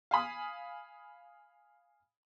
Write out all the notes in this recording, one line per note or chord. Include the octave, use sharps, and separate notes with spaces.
F5 G#5 B5 D#6